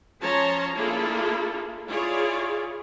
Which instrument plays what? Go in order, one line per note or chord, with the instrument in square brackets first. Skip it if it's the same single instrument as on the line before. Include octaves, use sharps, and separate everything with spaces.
[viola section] F3 C#4 C#5 A5 A#5 C6
A#3 D4 E4 F4 G#4 A4
E4 F4 G#4 C#5 D5